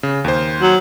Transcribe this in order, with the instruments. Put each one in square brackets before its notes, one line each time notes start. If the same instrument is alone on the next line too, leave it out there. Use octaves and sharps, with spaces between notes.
[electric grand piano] C#3
D#2 C5
[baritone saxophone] F#3